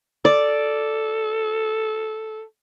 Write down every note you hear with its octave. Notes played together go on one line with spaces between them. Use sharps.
A4 D5